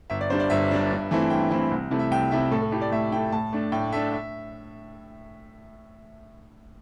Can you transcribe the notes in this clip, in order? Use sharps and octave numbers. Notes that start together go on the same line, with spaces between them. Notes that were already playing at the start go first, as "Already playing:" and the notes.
G1 E5
D5
G2 G3 D4 C5
D5
G1 E5
G2 G3 D4
G2
E3 A3 C4 E4
G2 G5
E3 A3 C4 E4
C2
C3 A3 E4
E5
C2 G5
C3 A3 E4 E5
A2 A4
A4
A3 E4 G4
D5
A2 E5
A3 E4 G5
A2 A5
A3 D4
A2 G5
A3 D4 E5
E5